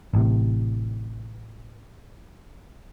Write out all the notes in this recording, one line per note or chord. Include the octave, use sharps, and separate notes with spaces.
A1 A2 C3